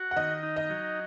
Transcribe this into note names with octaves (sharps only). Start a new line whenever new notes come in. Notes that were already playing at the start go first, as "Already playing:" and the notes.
Already playing: F#4
F#5
D#3 D#5
D#4
D#5
F#3